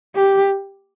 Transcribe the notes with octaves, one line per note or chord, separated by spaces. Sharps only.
G4